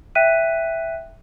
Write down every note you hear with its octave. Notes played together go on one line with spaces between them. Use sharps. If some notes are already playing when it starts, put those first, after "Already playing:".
E5 G5 F#6 B6 D#7